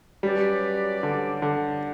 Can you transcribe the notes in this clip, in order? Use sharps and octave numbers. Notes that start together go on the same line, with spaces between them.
F#3 G3 C#4 G4 B4 D5
D3
D3